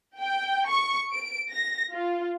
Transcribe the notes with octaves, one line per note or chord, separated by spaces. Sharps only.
G5
C#6
D7
A#6
F4